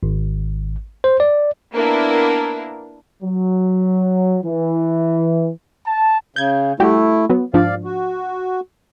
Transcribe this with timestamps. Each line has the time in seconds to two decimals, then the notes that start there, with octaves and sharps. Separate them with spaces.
0.03 G#1
1.04 C5
1.20 D5
1.74 A#3 B3 D4 E4 A#4
3.23 F#3
4.44 E3
5.85 A5
6.36 C#3 G6 G#6
6.80 G3 A3 E4 F#4 G4
7.30 F#3 B3
7.54 G#2 F3 D4 D5 F5
7.84 F#4